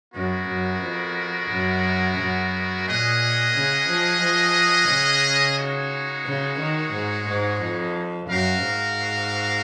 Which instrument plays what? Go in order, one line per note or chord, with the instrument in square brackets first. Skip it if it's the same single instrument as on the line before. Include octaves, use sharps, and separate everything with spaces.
[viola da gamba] F#2 [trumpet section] G#3 B3 F#4 A#4
[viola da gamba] F#2
F2
F#2
F#2
[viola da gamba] A#2 [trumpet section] C#4 G#4 D#5 F#5
[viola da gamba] C#3
F3
F3
C#3
[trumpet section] G#3 D#4 F#4 C#5
[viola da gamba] C#3
D#3
G#2
G#2
F2
[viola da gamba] F#2 [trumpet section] F#4 A#4 F5
[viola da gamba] G#2